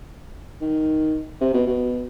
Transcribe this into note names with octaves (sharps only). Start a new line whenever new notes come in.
D#3
C3
B2
B2